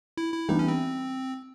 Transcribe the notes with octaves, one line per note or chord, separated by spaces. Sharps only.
E4
E4
E3 G3 B3 D4 D#4 G4
C#4
C4